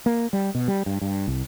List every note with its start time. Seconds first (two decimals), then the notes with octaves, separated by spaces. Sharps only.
0.06 A#3
0.33 G3
0.55 B2
0.68 G3
0.86 G2
1.01 G2
1.28 C2